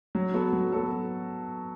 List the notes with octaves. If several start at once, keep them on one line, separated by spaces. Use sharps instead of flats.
F#3
B3 F#4 A4
F#3
B3 F#4 A4